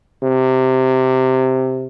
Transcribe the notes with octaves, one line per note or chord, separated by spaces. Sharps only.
C3